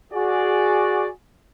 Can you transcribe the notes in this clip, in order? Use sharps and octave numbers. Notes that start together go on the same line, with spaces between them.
F#4 G#4 D5